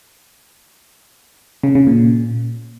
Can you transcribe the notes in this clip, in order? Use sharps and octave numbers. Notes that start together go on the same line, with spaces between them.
C#3
C#3
A#2